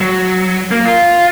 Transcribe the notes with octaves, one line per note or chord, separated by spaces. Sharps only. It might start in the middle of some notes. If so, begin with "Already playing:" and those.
F#3
A#3
F4